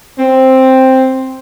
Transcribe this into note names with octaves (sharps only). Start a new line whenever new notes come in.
C4